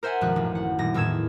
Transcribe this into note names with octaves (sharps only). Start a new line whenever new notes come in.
A#4 C5 E5 F#5 G#5
G#1 F#2 B2 F3 F#6
A1
F#5
D#1 A#6
E2 A2 D#3 E6 G#6 E7